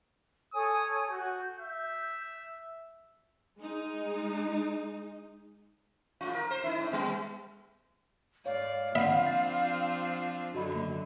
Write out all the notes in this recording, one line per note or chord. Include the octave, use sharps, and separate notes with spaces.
A4 C#5 G#5 D#6
F#4 G6
E5
G#3 D#4
A2 F4
A#4
C5
D#4 E4
A2
G3 B3
G#2 C#5 D5 F5
F3 C4 D4 D5 E5 F#5 B5
A6
F#2 D3 F#3 F#4 D#5 B5